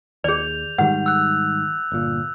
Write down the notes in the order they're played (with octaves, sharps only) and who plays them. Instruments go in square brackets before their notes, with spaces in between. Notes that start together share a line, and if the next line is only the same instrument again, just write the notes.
[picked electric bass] D#2 [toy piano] G#4 D5 [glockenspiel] G6 F7
[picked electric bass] G#2 D#3 G3 [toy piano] F#5
[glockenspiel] E6 F#6
[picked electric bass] G1 A#2